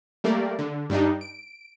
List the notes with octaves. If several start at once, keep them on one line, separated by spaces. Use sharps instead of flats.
G3 A3 A#3 A#4 D5
D3
G2 G3 D4 D#4
D7